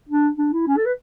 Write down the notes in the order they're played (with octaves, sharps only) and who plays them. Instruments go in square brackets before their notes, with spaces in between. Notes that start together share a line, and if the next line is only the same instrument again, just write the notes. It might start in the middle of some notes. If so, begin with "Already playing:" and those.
[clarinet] D4
D4
E4
C#4
A4
B4